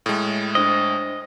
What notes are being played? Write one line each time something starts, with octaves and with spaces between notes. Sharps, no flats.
A2 G#3
D4 C5 D#5